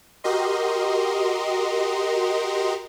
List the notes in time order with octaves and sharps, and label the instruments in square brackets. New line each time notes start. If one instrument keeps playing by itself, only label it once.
[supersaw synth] F#4 G4 A#4 D#5 C6